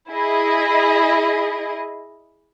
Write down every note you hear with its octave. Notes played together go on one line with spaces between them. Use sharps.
E4 G#4 D#5